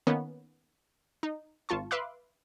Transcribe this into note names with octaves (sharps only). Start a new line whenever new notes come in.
D#3 A#3 B3 C#4
D#4
G#1 F4 A5 C#6
B4 E5 F5 C6 D6 F#6